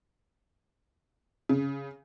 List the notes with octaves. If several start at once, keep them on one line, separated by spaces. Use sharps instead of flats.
C#3